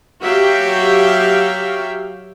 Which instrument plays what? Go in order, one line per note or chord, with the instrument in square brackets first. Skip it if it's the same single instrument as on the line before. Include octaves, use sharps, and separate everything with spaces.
[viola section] F#3 F#4 G4 E5 F5 G5